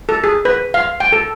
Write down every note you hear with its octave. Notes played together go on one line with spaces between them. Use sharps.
A4
G#4
B4
F5
G5
A4